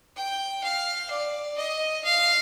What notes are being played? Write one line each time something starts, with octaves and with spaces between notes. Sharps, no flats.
G5
F5
D5
D#5
F5